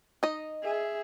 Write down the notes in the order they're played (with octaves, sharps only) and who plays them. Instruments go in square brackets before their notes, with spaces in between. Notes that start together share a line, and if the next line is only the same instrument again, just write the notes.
[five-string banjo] D#4 D#5
[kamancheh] G#4 E5